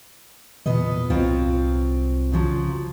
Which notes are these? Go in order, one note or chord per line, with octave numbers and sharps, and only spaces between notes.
E2 A#2 B3 D#5
C2 F#3 C4 F4
C#3 F3 F#3